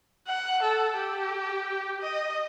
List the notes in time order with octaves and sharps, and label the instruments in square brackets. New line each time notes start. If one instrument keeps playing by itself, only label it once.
[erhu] F#5
A4
G4
D#5